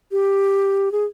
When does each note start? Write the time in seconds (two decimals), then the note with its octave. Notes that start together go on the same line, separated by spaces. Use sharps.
0.12 G4
0.92 G#4